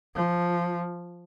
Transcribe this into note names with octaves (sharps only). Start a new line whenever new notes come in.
F3